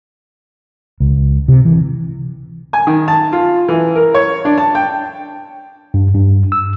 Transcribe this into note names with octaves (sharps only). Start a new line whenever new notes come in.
C#2
C3
E3
G#5
D#3
A5
F4
E3
A#4
C#5
D4
A5
G5
G2
G2
E6